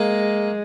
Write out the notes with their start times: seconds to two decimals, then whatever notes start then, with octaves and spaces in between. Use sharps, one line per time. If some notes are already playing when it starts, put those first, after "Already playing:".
Already playing: G#3 A#3